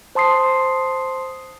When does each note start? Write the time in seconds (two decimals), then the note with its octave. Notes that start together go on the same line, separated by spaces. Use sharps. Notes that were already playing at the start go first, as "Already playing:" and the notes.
0.15 C5 A5 C6 D#6 C7